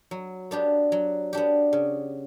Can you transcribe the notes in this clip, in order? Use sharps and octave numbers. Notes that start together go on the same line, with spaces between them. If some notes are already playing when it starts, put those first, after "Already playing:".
F#3
B3 D4 G4
F#3
B3 D4 G4
C#3